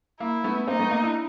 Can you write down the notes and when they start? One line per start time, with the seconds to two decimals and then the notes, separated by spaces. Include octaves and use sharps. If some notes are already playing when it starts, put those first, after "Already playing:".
0.20 A#3 E4
0.44 A3 B3
0.68 A#3 C4 D#4
0.79 A3 B3
0.91 A#3
1.03 D4 E4